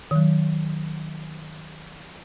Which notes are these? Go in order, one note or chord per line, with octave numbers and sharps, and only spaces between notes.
D#3 F#3